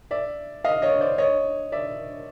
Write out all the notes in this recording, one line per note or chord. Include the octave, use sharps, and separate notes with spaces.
D5 E5
D#5 F5
C#5 D#5
C5 D5
C#5 D#5
D5 E5